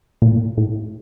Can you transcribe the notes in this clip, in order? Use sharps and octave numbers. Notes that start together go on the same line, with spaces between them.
A#2
A2
A2